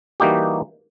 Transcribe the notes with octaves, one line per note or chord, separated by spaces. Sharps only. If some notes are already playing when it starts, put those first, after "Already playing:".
E3 G3 A#3 D#4 F#4 G4